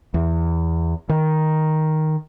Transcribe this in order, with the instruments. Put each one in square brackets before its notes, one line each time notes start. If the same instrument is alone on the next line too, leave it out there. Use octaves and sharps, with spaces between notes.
[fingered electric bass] E2
D#3